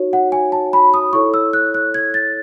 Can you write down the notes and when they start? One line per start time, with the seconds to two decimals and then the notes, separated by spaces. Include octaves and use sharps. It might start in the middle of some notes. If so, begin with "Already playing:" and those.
Already playing: D#4 F#4 C#5
0.13 F#5
0.32 G#5
0.52 A5
0.73 B5
0.94 D#6
1.13 E4 A4 C#5 C#6
1.34 E6
1.53 F#6
1.74 F#6
1.94 G#6
2.14 A6